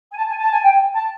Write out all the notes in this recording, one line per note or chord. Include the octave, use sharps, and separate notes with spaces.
G#5
A5
G#5
A5
G#5
G5
A5